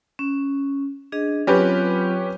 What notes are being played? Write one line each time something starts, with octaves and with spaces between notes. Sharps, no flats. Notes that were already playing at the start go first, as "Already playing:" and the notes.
C#4
D4 G#4 D#5
F#3 C4 C#4 F4 G4 B4